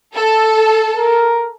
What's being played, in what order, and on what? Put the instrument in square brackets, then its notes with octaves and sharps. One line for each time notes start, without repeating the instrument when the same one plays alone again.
[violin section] A4
[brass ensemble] A#4